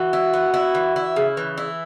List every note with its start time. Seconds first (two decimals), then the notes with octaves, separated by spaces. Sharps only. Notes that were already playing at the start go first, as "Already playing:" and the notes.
Already playing: E3 F#4
0.13 E4
0.34 B3
0.54 E4
0.75 E3
0.96 E4
1.16 C#3
1.37 E3
1.58 E4